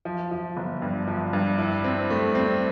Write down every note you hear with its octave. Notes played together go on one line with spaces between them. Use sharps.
F3
F3
G1
G2
F3
G2
E4
C4
A3
C4